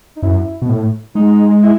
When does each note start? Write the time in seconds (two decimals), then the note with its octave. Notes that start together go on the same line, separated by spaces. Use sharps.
0.16 D#4
0.22 F#2 E4
0.62 B2
0.69 A2
1.15 G#3 D#4
1.63 E4